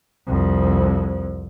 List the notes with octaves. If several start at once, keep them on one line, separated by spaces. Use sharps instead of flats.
C2 F2